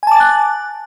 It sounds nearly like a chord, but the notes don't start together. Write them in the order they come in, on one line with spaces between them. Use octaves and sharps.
G#5 A5 D6 A6 F#6